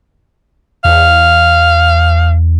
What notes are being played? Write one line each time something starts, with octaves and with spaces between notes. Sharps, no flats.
E2 F5